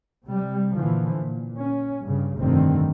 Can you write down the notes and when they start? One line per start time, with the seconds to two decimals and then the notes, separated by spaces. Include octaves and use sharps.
0.25 C3 G3
0.76 A#2 D3 E3 F3
1.17 A#2
1.57 C#4
2.03 G2 C#3
2.40 F1 G2 D3 D#3 C4